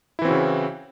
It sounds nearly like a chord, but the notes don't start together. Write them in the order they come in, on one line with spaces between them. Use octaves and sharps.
E4 E3 C4 F#4 C#3